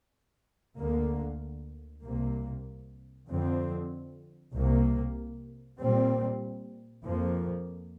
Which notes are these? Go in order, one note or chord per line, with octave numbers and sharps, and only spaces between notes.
D2 D3 A#3
C2 C3 A#3
F2 D3 F3 C4
C2 C3 A#3
A#2 G3 C4
F2 F3 A#3